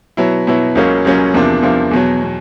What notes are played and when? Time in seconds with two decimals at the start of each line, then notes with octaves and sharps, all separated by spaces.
0.17 B2 F#3 B3 E4
0.47 B2 F#3 B3 E4
0.75 C#2 C#3 F#3 A#3 C#4
1.05 C#2 C#3 F#3 A#3 C#4
1.34 E2 C3 F3 A#3 D4
1.62 E2 C3 F3 A#3 D4
1.91 E2 B2 F#3
2.23 B2